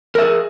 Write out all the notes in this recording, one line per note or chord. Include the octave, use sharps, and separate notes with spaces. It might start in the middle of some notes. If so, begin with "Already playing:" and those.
G#4 A#4 E5